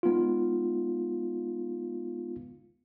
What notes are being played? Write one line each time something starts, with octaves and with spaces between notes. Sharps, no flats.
G#3 B3 D#4 F4